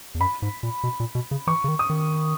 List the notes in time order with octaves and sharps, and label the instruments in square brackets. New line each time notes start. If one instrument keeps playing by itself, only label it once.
[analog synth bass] E2
[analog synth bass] F#2 [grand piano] B5
[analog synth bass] G#2
A#2
B2
A#2
B2
C#3
[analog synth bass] E3 [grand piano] C#6
[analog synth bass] C#3
D#3
[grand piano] D#6
[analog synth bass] D#3